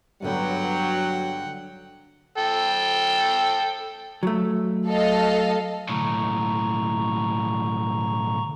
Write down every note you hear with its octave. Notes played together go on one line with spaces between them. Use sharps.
G2 D3 F#3 B3 F#5 G5
A4 G5
F#3 A3
A4 D#5 F5
B1 A2 D3 A#5 C#6